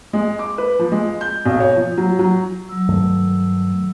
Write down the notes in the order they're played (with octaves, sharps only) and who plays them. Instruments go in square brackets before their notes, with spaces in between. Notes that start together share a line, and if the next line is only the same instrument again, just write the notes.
[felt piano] G#3
D6
B4
F3
G#3
G6
B1
C#5
F3
F#3
F#3
[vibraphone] F#3 E6
[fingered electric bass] G2 D#3 A3